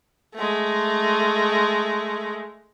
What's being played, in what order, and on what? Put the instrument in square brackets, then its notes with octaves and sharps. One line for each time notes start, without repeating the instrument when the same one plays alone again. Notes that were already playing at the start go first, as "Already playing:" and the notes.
[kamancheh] G#3 A3